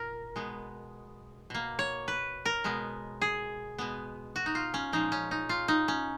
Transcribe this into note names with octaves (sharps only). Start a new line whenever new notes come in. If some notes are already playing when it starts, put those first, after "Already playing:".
Already playing: A#2 A#4
B2 G#3 B3
B2 A#3
C#5
B4
A#4
B2 G#3 B3
G#4
B2 G#3 B3
F#4
D#4
F4
C#4
A#2 F3 G#3 D#4
C#4
D#4
F4
D#4
C#4